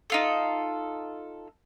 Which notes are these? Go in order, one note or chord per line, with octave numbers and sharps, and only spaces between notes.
D#4 F4 A4